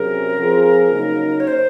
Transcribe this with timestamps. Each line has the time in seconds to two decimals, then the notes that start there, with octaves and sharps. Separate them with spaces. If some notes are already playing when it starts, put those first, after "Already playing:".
Already playing: C3 F#3 C#4 G#4 A#4
0.38 F3 C4 F4 G#4
0.92 C#3 F#3 A#3 D#4
1.40 C#5
1.47 C5